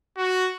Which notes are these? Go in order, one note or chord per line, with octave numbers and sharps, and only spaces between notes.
F#4